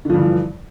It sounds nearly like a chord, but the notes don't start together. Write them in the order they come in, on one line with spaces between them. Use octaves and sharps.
D3 F3 G2 E3